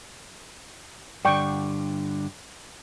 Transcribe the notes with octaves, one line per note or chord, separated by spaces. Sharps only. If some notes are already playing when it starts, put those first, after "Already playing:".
G2 D3 D5 G5 C#6